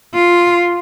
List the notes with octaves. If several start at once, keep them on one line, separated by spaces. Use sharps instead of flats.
F4